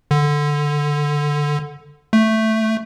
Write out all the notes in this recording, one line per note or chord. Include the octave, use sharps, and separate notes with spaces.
D3
A3